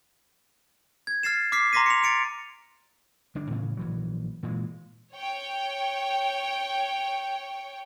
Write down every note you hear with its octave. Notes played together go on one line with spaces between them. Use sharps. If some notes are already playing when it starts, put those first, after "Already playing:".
G#6
F6 A6 C7 E7
D6 F6 B6 C7
A#5 C6 D6 A#6 B6 D#7
C#7 F7
A6 C#7 D7 F7
G1 G2 D4
A2 C#3 E3
A#1 E3 F#3
A#2 E3 G#3
C#5 G5